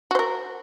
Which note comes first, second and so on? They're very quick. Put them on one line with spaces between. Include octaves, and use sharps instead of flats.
F#4 C5 A#4